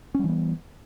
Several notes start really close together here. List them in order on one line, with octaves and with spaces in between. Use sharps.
C#4 G3 E3 B3